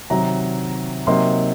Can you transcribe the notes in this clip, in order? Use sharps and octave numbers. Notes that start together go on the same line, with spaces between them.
C3 D#3 F#3 A#5
C3 F#3 A#3 D#4 C6